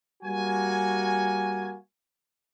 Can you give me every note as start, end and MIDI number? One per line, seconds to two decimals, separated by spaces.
0.23 1.76 55
0.23 1.76 58
0.23 1.76 66
0.23 1.76 80